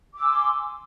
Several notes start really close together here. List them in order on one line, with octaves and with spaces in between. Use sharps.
D6 E6 G#5 C6